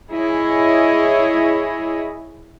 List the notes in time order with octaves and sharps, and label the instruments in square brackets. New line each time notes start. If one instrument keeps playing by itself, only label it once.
[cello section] E4 G#4 C#5 D#5